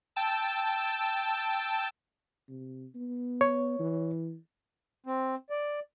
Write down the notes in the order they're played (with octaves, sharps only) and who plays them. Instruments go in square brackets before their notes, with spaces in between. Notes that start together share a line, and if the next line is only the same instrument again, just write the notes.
[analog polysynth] G5 A5 E6
[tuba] C3
B3
[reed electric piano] C#5
[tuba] E3
[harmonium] C4
D5